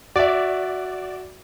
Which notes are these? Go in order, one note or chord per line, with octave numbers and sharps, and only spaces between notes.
F#4 D5 E5